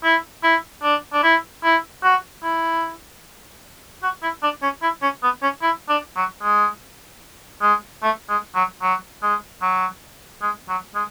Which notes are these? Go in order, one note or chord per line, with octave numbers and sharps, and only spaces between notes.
E4
E4
D4
D4
E4
E4
F#4
E4
F#4
E4
D4
C#4
E4
C#4
B3
C#4
E4
D4
F#3
G#3
G#3
A3
G#3
F#3
F#3
G#3
F#3
G#3
F#3
G#3